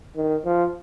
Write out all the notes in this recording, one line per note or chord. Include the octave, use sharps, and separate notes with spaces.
D#3
F3